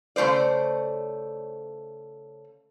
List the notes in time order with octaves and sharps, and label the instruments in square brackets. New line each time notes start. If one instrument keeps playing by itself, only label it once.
[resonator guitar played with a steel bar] C#3 A3 C4 C5 D5